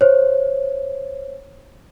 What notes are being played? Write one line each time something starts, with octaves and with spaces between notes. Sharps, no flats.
C5 C#5